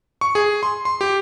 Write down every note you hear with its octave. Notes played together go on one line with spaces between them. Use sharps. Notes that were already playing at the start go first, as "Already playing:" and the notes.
C#6
G#4
C6
C6
G4